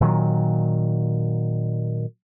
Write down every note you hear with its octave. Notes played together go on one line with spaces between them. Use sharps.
A#2 D#3 F#3